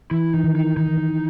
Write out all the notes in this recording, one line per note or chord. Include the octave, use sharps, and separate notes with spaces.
E3 E4
E3 D#4
D#3
D#4
D#3 D#4
E3
D#3
D#3